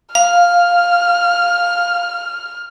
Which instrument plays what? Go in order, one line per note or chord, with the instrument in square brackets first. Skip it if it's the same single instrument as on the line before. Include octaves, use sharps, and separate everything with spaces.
[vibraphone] F5 [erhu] F6